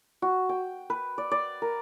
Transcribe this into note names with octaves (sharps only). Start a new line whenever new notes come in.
F#4
G5
B4
D5
D5
A#4